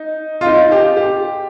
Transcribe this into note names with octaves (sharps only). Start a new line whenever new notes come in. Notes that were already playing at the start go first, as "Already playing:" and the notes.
Already playing: D#4
F4
D#4
G4
G4